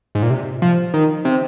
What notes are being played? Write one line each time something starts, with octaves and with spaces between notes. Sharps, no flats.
G#2
A#2
C3
F3
D#3
C3